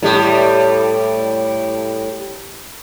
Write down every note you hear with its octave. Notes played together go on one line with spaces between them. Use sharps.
A2 G3